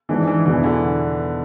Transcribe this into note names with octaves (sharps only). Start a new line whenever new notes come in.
G#2 E3 G#3 D4
E3
E2 B2 E3 B3 D4 G#4
D3